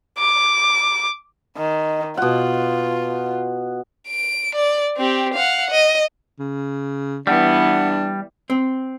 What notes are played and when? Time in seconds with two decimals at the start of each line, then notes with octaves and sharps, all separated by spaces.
0.19 D6
1.57 D#3
2.17 B2 F4 F#5
4.08 D7
4.55 D5
4.97 C4 G4
5.34 F5 F#5
5.71 D#5
6.39 C#3
7.27 E3 G3 B3 D4 F#5
8.50 C4